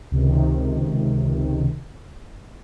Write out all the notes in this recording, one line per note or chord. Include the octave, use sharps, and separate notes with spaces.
C#2 C3 D#3